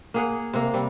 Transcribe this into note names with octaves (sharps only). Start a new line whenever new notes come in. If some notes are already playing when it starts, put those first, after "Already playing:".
A#3 G#4 F#5
C3 A#3
C3 G3